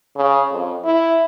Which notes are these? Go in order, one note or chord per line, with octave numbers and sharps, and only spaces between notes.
C#3
F2
E4